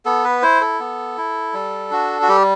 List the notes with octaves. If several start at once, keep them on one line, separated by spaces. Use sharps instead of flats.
B3 A4
B4
E4 C5
A4
B3
E4
G3
D4 F#4
F#4
G3 G4